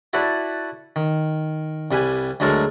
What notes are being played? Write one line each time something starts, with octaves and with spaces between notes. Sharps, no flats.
E4 F#4 A4 B4 D5
D#3
C2 G3 B4 G#5
D2 F#3 G#3 A4 A#4 C#6